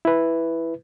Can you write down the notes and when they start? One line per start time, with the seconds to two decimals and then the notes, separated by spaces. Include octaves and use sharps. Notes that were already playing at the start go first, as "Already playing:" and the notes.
0.05 E4 B4